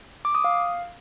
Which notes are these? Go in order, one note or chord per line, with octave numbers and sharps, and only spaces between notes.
D6
D#6
F5